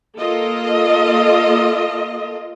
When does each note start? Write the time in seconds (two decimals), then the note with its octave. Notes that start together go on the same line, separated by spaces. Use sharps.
0.17 A#3 F4 A4 D#5